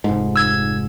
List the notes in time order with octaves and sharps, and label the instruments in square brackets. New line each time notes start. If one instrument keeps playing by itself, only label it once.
[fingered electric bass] F1 G#2
[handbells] E6 G#6